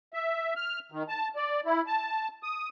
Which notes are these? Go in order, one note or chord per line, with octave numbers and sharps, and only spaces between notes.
E5
F6
D#3
A5
D5
E4
A5
D#6